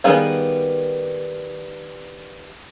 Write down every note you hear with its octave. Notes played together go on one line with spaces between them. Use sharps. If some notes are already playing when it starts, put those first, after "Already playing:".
D#3 G3 B3 G#4 F5